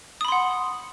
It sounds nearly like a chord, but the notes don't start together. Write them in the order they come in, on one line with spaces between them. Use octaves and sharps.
D#6 B5 C6 F#5